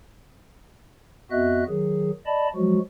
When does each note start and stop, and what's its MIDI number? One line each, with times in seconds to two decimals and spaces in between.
1.31 1.63 41
1.31 1.63 59
1.31 1.63 66
1.31 1.63 75
1.31 1.63 76
1.31 1.63 90
1.68 2.11 51
1.68 2.11 54
1.68 2.11 68
2.26 2.48 74
2.26 2.48 75
2.26 2.48 81
2.26 2.48 83
2.55 2.79 53
2.55 2.79 54
2.55 2.79 56
2.55 2.79 66